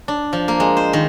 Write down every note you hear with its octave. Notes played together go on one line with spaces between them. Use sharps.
D4
F3
A#3
G#3
C5
D#3